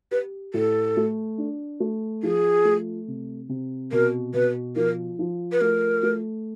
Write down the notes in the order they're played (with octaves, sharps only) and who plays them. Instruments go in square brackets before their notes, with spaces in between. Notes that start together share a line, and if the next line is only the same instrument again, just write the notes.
[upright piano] G4 [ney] B4
[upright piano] A2 [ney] A4
[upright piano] A3
D4
A3
[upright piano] F3 [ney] G#4
[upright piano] A3
C3
C3
[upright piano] B2 [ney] A#4
[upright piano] B2 [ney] B4
[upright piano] F3 [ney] A#4
[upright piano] F3
[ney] B4
[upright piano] A3 [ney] A#4
[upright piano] A3